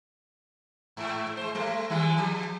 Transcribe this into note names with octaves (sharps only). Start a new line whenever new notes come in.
G#2
G#3 C5
G3 A3
D#3 G3 G#3
F3